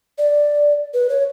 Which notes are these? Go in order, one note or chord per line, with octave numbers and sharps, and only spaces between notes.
D5
B4
C#5